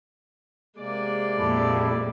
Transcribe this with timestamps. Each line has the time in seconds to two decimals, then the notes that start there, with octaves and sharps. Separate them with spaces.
0.79 C3 G#3 A#3 D5
1.37 F2 A#2 E4 G4 A4